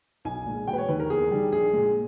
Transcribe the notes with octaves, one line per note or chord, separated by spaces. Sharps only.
B1 G#5
A#2 G#3
E1 G5
B4
C#5
D#2 D#3 B4
A#4
E2 G#4
D#3 G3
A#1 G#4
A#2 G#3